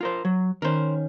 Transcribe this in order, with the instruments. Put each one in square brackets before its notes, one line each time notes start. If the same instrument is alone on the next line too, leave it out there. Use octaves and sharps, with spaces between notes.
[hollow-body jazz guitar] F4 A#4 C5
F#3
[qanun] D#3 C#4 [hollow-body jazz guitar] A#4 C5